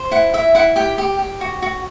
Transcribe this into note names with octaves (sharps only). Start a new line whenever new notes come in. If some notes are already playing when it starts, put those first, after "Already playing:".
Already playing: C5
E4 F#5
E4 E5
E4 F#5
G4 G5
G4
G4
F#4
F#4